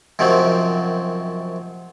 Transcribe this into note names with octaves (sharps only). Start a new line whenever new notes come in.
F#2 C3 D#3 F3 F#3